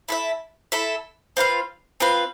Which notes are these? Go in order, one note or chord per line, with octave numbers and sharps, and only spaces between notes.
E4 A4 E5
E4 A4 E5
C4 F4 B4 F5
C4 F4 B4 F5